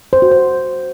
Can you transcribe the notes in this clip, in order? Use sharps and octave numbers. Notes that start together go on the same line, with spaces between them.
C5
F#4
C5